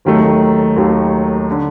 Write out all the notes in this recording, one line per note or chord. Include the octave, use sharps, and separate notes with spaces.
D#2 D#3 F#3 A3
D#2 D#3 F#3 A3
D3